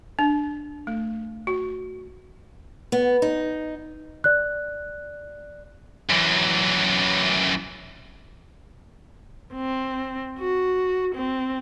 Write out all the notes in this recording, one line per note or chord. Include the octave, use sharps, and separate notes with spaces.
D4
A3
F#4
B3
D#4
D5 F#6
F#2 E3
C4
F#4
C4